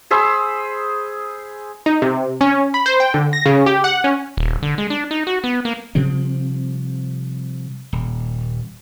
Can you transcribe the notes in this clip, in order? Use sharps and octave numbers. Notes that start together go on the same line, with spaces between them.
G#4 C5 B5 E6
D#4
C3
C#4
B5
C5
G5
D3
A#6
C#3
G4
F#5
C#4
D#1
D3
G#3
D4
D#4
F#4
B3
A#3
C3 F3 G3 C4
D#1